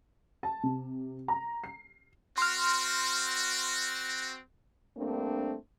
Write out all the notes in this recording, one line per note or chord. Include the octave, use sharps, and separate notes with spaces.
A5
C3
A#5
C7
C4 F#4 C6 F6
G2 A3 A#3 C4 D4